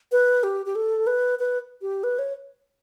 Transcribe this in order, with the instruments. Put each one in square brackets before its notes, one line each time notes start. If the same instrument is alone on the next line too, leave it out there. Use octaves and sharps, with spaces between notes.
[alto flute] B4
G4
G4
A4
B4
B4
G4
B4
C#5